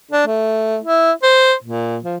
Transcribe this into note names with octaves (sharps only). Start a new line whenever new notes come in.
D4
A3
E4
C5
A#2
F3